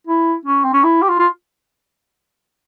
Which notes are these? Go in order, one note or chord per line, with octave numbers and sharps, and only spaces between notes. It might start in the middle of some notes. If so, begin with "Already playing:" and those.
E4
C#4
C4
C#4
E4
G4
F4
F4